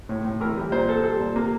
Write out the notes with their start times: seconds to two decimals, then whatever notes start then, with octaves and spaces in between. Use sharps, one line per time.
0.09 A2
0.25 A2
0.41 E3 A#4
0.58 G3
0.72 A#2 C5
0.88 G3 A4
1.04 G3 A4
1.20 A#2
1.35 C3 A#3